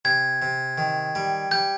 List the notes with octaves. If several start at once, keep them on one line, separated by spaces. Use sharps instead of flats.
C3 G#6
C3
D#3
G3
G3 G6